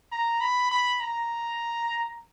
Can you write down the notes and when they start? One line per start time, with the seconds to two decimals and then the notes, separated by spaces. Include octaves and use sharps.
0.12 A#5
0.41 B5
0.71 B5
1.01 A#5